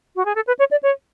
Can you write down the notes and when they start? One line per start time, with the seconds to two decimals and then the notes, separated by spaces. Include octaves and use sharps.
0.16 F#4
0.25 G#4
0.35 A4
0.47 B4
0.59 C#5
0.71 D5
0.83 C#5